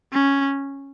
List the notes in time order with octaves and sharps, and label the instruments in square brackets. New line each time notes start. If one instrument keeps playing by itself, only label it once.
[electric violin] C#4